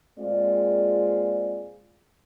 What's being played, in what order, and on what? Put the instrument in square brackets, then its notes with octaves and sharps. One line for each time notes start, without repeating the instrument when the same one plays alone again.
[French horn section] A#2 G#3 C4 F4 G#4 D5